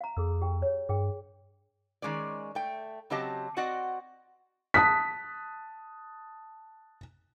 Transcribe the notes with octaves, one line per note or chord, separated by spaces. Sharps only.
F5 A#5
F2 G#4 A4 E6
G4 G5
C#5
G2 G#4 A#4 G5
D#3 F3 G#3 C#4 D5
A3 G5
C#3 F#3 C4 G4 D#5 A5
C4 F#4 D5 D#5 F#5
A5 D#6 F#6 B6